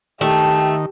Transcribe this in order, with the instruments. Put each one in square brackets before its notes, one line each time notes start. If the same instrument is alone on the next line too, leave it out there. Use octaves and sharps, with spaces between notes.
[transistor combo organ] D#3 [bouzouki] A3 [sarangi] G4